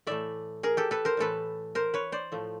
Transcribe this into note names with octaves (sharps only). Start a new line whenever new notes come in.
A2 E3 A3 D5 E5
G#4 A#4
G4 A4
A4 B4
A#4 C5
A2 E3 A3 A4 B4
A#4 C5
B4 C#5
C5 D5
A2 F3 A3